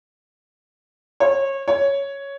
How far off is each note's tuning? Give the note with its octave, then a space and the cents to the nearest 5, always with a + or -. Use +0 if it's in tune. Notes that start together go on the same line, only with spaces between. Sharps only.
C#5 -25
C#5 +5